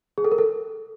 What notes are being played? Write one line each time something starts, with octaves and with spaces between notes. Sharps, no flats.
G#4
A4
A#4
A4